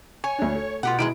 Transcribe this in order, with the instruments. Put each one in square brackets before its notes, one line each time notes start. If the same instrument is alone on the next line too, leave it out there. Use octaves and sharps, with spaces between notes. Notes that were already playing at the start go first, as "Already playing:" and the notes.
[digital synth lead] C#5 [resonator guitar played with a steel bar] G#5
[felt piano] D2 D4
A3
[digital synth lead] B2 [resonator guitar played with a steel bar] F4 G4 F#5
[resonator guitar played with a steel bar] D#3 G3 G#3 [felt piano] E4 D7